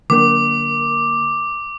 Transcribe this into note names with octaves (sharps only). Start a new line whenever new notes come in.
D3 A#3 A#4 D6